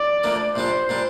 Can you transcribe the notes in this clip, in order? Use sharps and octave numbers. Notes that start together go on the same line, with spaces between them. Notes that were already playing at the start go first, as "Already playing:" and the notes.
Already playing: D5
D2 D3 F3 A#3
A#1 A#2 G3 D4 C5
A#2 G3 D4